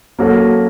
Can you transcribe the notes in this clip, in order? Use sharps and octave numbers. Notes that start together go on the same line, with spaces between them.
F#3 A#3 C#4 F#4 A4